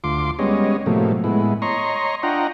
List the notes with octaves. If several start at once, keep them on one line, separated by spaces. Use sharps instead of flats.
D2 F4 C6 D6
G3 G#3 B3 C#4 C#5 D#5
A2 C3 F3 F#3 A3 A#3
A2 G#3 B3 E4
C#5 D#5 A#5 C6 C#6
D4 F4 D#5 F#5 G5 A#5